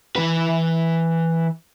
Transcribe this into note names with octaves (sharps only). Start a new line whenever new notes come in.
E3 B4